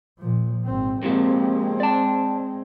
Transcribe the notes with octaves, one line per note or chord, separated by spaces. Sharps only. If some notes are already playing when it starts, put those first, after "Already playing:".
A#2 F3
G#1 C4
C3 F3 G#3 A#3 C4
D5 A5